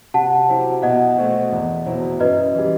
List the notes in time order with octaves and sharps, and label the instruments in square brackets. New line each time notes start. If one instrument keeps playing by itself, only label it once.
[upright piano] C3 [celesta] F#5 A5
[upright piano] F#3 C4 E4 G4
[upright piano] B2 [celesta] D#5 F#5
[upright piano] A3 C4 F#4
E2
B2 F#3 C4 E4
[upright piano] F#2 [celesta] B4 D#5
[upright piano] E3 G3